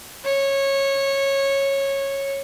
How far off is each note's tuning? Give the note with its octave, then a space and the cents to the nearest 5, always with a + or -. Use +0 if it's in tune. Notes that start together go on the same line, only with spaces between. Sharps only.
C#5 -15